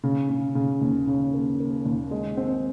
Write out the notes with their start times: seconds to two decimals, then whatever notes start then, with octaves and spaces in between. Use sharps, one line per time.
0.03 C#3
0.30 C#3
0.55 C#3
0.81 D#2
1.07 C#3
1.34 A#3
1.60 A#3
1.86 D#2
2.11 G#3
2.37 C4